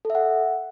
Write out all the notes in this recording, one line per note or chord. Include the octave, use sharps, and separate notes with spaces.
A4
E5
F#5